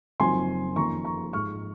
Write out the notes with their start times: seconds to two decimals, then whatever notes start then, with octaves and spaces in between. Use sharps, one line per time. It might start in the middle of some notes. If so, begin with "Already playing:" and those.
0.20 F#1 F#2 F3 C4 D#4 G#5 C6
0.76 F2 D#3 A#3 C#4 A#5 C#6
1.05 A#5 C#6
1.33 G#2 F3 G#3 C#6 F6